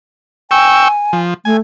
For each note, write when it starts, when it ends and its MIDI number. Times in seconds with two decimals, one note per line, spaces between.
0.51 0.88 79
0.51 1.20 80
0.51 0.88 85
0.51 0.88 88
1.13 1.34 53
1.45 1.58 57
1.45 1.57 80